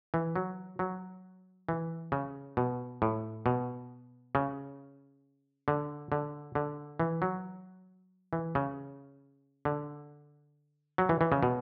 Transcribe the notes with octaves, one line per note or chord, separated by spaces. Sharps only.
E3
F#3
F#3
E3
C#3
B2
A2
B2
C#3
D3
D3
D3
E3
F#3
E3
C#3
D3
F#3
E3
E3
C#3
B2